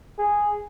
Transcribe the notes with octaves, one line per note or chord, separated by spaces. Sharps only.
G#4